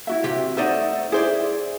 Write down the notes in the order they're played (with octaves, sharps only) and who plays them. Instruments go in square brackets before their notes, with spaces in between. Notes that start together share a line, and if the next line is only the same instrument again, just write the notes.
[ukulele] E4 F#4 E5
[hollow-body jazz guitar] C3 G4
[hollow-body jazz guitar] A3 D#4 E5 [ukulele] C5 D5 F#5
[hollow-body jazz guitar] E4 C5 D5 [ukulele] G#4